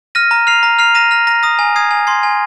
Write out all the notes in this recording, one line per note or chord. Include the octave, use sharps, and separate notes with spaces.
F6 A#6 D#7
A#5
F6 C7 F7
A#5
F6 C7 F7
A#5 A#6 D#7
F6 A#6
A#5 A#6
D#6 A#6
G#5
D#6 G#6 C7
G#5
C6 G#6 C7
G#5